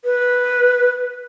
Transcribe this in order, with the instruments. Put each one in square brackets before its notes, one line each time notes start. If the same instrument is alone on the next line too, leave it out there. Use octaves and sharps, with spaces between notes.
[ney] B4